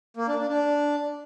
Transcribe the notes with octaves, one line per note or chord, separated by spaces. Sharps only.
A#3
D4
D4
D4